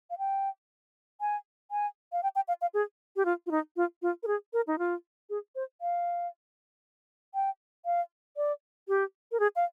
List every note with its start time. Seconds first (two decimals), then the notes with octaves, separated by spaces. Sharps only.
0.10 F5
0.18 G5
1.21 G#5
1.71 G#5
2.12 F5
2.23 G5
2.36 G5
2.48 F5
2.61 F5
2.74 G#4
3.16 G4
3.25 F4
3.46 F4
3.51 D#4
3.76 F4
4.02 F4
4.23 A#4
4.27 G#4
4.53 A#4
4.67 D#4
4.79 F4
5.30 G#4
5.55 C5
5.81 F5
7.35 G5
7.86 F5
8.37 D5
8.88 G4
9.32 A#4
9.40 G#4
9.56 F5